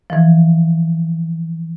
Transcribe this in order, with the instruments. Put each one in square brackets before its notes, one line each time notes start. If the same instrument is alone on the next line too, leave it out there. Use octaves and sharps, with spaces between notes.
[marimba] E3 F3